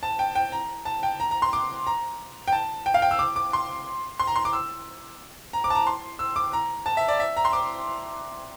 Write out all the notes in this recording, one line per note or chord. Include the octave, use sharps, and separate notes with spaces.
A5
G5
G5
A#5
A5
G5
A#5
A#5
C6
D6
A#5
G5
A5
G5
F5
G5
E6
D6
D6
C6
C6
A#5
C6
D6
E6
A#5
D6
A5
A#5
C6
E6
D6
A#5
A5
E5
D5
E5
A#5
C6
D6